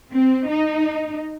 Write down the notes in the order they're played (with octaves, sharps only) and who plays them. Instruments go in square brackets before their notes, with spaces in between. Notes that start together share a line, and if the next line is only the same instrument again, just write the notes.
[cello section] C4
D#4